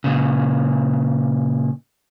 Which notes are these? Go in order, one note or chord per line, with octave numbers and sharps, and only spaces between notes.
A#2 C#3